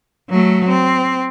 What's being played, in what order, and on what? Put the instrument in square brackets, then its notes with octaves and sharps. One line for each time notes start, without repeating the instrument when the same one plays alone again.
[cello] F#3 A3
C4